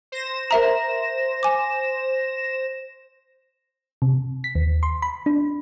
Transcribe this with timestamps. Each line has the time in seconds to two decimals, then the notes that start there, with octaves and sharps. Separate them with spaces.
0.12 C5 A#6 E7
0.51 A#4 E5 A#5
1.43 G#5 D6
4.02 C3
4.44 B6
4.55 D#2
4.83 C6
5.02 B5
5.26 D4